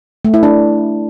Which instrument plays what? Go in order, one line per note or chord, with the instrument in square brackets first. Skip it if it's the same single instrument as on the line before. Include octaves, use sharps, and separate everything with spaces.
[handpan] A3
E4
D4